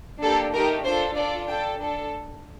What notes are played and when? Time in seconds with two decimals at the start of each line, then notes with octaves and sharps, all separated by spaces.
0.22 A#3 D4 G4 A4
0.54 A3 D#4 G4 A#4
0.85 D4 F4 A4 C5
1.16 D4 F4 A4 D5
1.48 D4 A4 G5
1.80 D4 A4